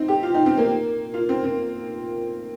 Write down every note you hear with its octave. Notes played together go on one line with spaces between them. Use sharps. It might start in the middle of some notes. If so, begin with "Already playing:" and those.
Already playing: C4 D#4
G4
F4
D#4
C4
A#3
F4
C4
C4